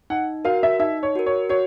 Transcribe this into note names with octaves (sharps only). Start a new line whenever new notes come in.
D#4 F#5
F#4 A#4 F5
E5
D#4 E5
C#5
F#4 A#4
C#5
F#4 C#5